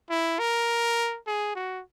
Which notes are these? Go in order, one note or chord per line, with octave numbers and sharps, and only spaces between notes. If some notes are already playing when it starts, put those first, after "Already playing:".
E4
A#4
G#4
F#4